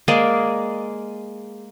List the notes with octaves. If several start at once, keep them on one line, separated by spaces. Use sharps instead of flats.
G#3 A#3 G#4 D5